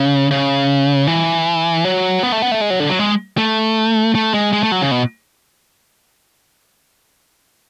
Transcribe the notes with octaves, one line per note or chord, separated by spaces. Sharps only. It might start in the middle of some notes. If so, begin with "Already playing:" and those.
Already playing: C#3
C#3
E3
F#3
B3
A3
B3
A3
G#3
F#3
D3
F#3
G#3
A3
A3
G#3
G#3
A3
F#3
C#3
B2